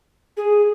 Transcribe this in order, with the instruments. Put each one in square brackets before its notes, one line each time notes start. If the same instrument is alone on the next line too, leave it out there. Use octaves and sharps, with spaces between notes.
[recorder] G#4